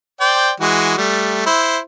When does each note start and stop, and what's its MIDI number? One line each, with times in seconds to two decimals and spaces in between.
0.21 0.51 72
0.21 0.51 74
0.21 0.51 79
0.60 0.95 52
0.60 0.95 56
0.60 0.95 66
0.98 1.45 55
0.98 1.45 57
1.46 1.78 64
1.46 1.78 72